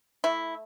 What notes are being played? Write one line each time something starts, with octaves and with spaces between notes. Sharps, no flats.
A3 E4